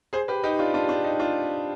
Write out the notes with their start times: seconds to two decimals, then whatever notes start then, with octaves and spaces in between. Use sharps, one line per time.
0.13 G#4 C5
0.28 G4 B4
0.43 D#4 G4
0.59 D4 F4
0.74 D4 F4
0.89 D4
1.04 D#4
1.19 D4 F4